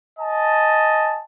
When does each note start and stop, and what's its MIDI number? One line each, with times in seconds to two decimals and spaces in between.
0.19 1.21 75
0.19 1.21 80
0.19 1.21 81